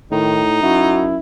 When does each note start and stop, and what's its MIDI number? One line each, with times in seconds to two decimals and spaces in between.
0.11 0.59 45
0.11 0.43 51
0.11 1.18 63
0.62 1.18 42
0.62 1.20 64
0.62 1.06 66